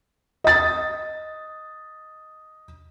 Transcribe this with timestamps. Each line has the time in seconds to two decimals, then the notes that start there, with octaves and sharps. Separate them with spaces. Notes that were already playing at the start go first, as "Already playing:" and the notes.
0.44 D#5 A6